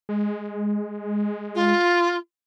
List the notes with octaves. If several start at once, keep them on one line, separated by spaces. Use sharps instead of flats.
G#3
F4